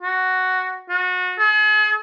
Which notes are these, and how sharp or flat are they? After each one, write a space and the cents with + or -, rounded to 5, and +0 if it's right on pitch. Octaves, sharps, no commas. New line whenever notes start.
F#4 +5
F#4 -30
G#4 +45